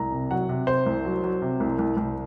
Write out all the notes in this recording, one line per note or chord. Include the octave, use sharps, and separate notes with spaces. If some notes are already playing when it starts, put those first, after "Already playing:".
Already playing: C2 A#5
C3
F#3 F#5
C3
C3 C5
C2
F#3
F#3
C3
C2
C2
C2